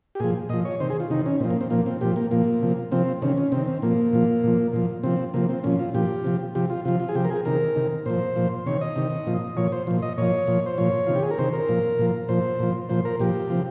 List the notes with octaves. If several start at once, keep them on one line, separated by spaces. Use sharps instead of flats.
G4
A#2 F3 G#4
A#2 F3 D#5
C#5
C3 D#3 C5
G#4
F4
C3 D#3 D#4
C#4
A#2 F3 C4
A#3
C4
A#2 F3 A#3
C4
A#2 F3 G4
A#3
A#2 F3 A#3
C3 F3
C3 F3 C4
C3 D#3 C#4
C#4
C3 D#3 C4
C4
A#2 F3 A#3
A#2 F3
A#2 F3
A#2 F3
C3 F3 C4
C3 F3 A#3
C4
A#2 F3 C#4
F4
A#2 F3 G4
C3 F3
C3 F3 G4
F4
C3 F3 F4
F4
G#4
C3 F3 G4
A#4
G#4
C3 D#3 A#4
C3 D#3
A#2 F3 C5
A#2 F3
C3 D#3 C#5
D#5
C3 D#3
A#2 F3
A#2 F3 C#5
C5
A#2 F3
D#5
A#2 F3 C#5
A#2 F3
C5
A#2 F3 C#5
C3 D#3 F4
G4
G#4
A#4
C3 D#3 C5
A#4
A#2 F3
A#2 F3
A#2 F3 C5
A#2 F3
A#2 F3 C5
A#4
A#2 F3 G4
C3 F3